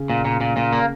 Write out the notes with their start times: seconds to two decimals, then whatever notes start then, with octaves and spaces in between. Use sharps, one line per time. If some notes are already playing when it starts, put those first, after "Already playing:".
Already playing: C#3
0.10 A#2
0.25 A#2
0.41 A#2
0.57 A#2
0.73 A#3